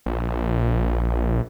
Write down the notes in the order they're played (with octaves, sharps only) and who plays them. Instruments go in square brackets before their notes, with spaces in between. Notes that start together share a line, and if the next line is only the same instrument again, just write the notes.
[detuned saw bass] A#1